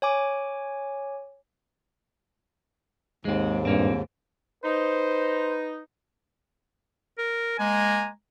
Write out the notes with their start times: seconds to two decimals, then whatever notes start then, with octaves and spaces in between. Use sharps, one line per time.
0.02 C#5 G#5 D6
3.25 D#2 G#2 G#3 C4
3.65 G2 A#2 A#3 C4
4.64 D#4 B4 C5
7.18 A#4
7.59 G#3 A#3 G#5 A#5